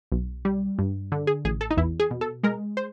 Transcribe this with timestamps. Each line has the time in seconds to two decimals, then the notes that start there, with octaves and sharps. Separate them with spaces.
0.12 B1
0.45 G3
0.79 G2
1.12 D3
1.27 G#4
1.45 A1 G#4
1.61 A4
1.71 D#4
1.77 E2 E4
2.00 G#4
2.11 B2
2.21 A4
2.43 G#3 A#4
2.77 C5